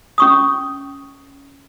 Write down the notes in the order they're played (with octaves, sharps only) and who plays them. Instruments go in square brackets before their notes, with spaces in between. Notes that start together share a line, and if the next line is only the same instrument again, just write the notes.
[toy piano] C#4 C#6 D#6